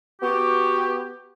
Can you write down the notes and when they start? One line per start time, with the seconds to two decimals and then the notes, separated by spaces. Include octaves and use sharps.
0.21 B3 F#4 G4